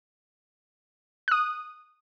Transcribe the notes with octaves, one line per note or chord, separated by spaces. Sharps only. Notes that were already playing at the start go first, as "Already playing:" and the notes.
D#6 F#6